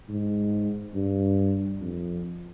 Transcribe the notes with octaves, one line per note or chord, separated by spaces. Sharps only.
G#2
G2
F2